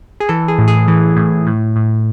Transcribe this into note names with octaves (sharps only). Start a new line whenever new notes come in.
G#4
E3 A4
G#4
A2
G#4
E3
A2
A2
A2